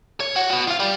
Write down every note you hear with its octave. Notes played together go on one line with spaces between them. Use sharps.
C#5
F#4
B3 F#4
F4 F5
G4 D5